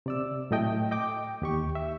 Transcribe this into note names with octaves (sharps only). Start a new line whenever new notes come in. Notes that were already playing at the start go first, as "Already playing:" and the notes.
C3 D5 E6
A2 F#3 A3 D#5 G5
D#5 G5 D6
D#2 G4 C#6
E5